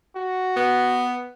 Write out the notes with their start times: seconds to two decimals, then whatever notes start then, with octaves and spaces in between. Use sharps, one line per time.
0.16 F#4
0.57 B3